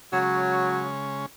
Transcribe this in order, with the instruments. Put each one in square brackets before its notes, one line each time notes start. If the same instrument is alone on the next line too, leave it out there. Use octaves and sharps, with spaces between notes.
[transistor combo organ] C#3 G#3 C#4 [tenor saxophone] F#3